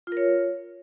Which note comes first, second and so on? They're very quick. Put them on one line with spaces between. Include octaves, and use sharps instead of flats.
F4 A#4 C#5